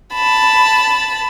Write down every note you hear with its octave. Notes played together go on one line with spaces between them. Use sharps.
A5 B5